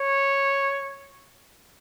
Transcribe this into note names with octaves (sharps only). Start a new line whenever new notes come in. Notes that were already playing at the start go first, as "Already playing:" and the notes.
Already playing: C#5